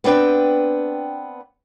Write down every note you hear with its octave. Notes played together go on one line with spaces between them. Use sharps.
B3 C4 D4 B4 G5